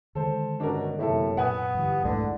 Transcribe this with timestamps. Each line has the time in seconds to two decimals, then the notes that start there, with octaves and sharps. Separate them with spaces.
0.15 D3 D#3 G#3 A4 C5
0.60 G1 B2 C#4 D4 A#4
0.98 F#2 A2 C3 A#3 E4 A4
1.37 A#2 B3 F#5 G#5 D#6
1.74 G2 D3 E3 F3 G3
2.04 C2 F2 G#2 D3 E3 G#3 A3